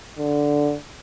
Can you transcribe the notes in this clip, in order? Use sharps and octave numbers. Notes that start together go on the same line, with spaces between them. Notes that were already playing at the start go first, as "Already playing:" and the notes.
D3